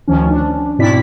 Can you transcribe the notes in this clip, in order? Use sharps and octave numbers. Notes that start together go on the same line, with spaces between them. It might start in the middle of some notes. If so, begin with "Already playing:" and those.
D2 D#3 F3 C#4
D4
G#2 B2 C4 E4 D5 B6